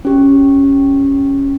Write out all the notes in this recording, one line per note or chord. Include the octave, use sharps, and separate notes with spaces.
C#4 G4